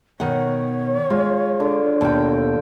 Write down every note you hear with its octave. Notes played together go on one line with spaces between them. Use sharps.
B2 D#3 C#5 F#5
G#3 F4
D3
D#2 B2 A4 G5